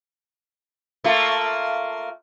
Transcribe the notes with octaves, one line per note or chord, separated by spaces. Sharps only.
A3 A#3 F4